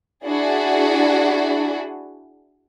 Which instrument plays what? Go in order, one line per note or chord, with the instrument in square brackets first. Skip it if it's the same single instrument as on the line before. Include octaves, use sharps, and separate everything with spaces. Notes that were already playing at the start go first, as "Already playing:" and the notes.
[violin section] D4 E4 F#4 G#4